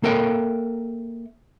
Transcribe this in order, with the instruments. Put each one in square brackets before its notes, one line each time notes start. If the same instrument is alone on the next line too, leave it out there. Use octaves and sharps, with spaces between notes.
[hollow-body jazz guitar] A#3 A4 A#4 E5 G5